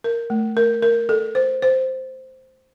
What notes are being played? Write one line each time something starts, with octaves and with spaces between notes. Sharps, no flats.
A#4
A3
A#4
A#4
A4
C5
C5